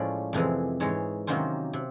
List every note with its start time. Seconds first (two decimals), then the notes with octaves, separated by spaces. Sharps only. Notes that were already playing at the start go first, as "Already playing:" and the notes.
Already playing: A2 F3 G#3 C#4 D5
0.33 F2 C3 E3 G#3
0.80 G#2 E3 G#3 C#5
1.27 C3 D#3 F#3 A#3 C#4 C5
1.73 C3